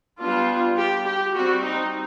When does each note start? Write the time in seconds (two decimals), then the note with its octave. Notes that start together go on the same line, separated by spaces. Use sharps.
0.19 G3 B3 D4 F4
0.77 G4
1.06 G4
1.34 G3 C4 F#4
1.63 D#4